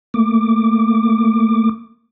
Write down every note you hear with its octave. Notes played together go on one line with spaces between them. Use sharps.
A3 A#3 D6